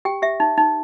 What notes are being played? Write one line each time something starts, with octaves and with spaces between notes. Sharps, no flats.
G4 G5
G4 E5
D#4
D#4